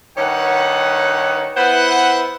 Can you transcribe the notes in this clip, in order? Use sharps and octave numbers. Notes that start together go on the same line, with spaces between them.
G2 D#3 G4 C#5 F#5
B3 E4 B4 C5 F#5